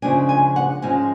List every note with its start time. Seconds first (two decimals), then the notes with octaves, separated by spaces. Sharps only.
0.02 C#3 F3 G#3 D4 G#5
0.29 G#5
0.56 F#5
0.82 G#2 F3 G#3 C#4 G#5